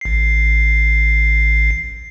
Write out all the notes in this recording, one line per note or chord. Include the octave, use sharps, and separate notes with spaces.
A1 C7